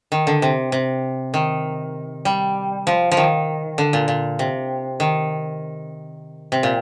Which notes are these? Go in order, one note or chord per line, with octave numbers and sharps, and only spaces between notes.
D#3
D3
C3
C3
D#3
G3
F3
F3
D#3
D3
A#2
A#2
C3
D#3
C3
A#2